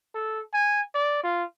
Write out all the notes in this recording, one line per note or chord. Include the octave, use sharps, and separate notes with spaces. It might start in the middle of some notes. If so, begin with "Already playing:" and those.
A4
G#5
D5
F4